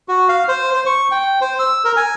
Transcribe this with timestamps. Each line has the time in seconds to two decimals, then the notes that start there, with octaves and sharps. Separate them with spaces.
0.08 F#4
0.29 F5
0.48 C5
0.74 C5
0.86 C#6
1.11 G5
1.41 C5
1.59 E6
1.85 A#4
1.97 G#5